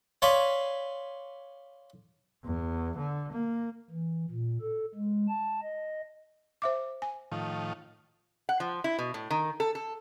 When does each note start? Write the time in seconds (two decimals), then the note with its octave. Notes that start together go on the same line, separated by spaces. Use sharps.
0.22 C#5 D5 F5 G#5 B5 C6
2.44 E2
2.98 D3
3.31 A#3
3.90 E3
4.31 A#2
4.61 A4
4.95 G#3
5.29 A5
5.62 D#5
6.62 C5 E5 D6
7.02 G#5
7.32 A2 D#3 F3
8.49 F#5
8.60 F3
8.84 E4
8.99 B2
9.14 A2
9.30 D#3
9.60 A4
9.75 A4